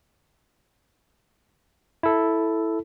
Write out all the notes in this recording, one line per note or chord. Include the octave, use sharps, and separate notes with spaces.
E4 A4